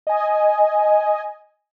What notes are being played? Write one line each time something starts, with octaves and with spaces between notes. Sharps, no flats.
D#5 G#5